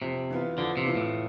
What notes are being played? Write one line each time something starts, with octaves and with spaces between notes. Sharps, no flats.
F2 C3
E3 B3 F4
F2 D3
C3
E3 B3 F4
A2